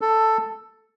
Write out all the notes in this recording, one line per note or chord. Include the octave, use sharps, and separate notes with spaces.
A4